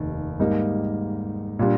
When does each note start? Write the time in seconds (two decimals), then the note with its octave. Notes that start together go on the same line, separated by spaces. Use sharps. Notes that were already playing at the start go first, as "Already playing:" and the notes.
Already playing: F1 D#2 D#3
0.40 G#2 G3 A#3 D#4
1.59 A#2 G3 D4